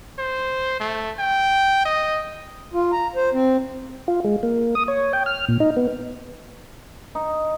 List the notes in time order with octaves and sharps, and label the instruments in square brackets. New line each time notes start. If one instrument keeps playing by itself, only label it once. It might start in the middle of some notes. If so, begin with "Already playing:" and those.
[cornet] C5
A3
G5
D#5
[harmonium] F4
A#5
C5
C4
[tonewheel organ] F4
G#3
A#3
D#6
C#5
G5
F6
A#2
D#4
B3
[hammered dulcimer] D#4